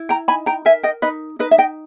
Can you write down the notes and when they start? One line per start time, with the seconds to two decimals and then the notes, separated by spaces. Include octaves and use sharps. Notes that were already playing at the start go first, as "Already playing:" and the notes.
Already playing: E4
0.09 G5 A#5
0.28 D#4 G#5 B5
0.46 G5 A#5
0.65 A#4 E5 G#5
0.83 D#5 G5
1.02 D#4 B4 D#5
1.39 D#4 B4 D#5
1.51 E5
1.58 D#5 G5